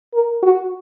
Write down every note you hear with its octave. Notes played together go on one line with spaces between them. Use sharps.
A#4
F#4